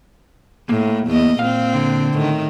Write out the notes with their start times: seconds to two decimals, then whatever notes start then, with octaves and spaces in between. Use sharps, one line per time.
0.69 A2 A#3
1.08 E2 D#5
1.39 A#2 C4 F5
1.74 D3
2.14 A2 D#3